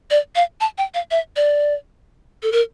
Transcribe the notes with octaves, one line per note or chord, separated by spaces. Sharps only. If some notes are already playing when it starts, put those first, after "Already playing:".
D5
F5
A5
G5
F5
E5
D5
A4
A#4